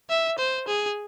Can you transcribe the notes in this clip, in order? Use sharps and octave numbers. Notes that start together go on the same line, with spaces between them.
E5
C5
G#4